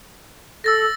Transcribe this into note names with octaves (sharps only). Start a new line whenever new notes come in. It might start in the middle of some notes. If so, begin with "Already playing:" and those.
A4 E6 A6 A#6